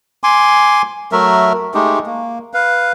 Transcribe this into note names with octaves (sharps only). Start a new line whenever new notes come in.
G#5 C6 D6
F#3 A3 A#4 E5
G#3 A3 D#4 G4
A#3
B4 F5